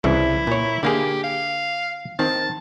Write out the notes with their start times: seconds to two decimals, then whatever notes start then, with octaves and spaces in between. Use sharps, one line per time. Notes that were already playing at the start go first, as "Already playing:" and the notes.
0.04 C2 C#3 E3 E4
0.47 A#2 C#5
0.83 D3 A#3 G4 G#4
1.24 F5
2.19 D#3 C4 A5